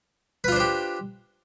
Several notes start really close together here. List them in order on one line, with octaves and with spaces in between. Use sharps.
B4 F4 D4 C5 G4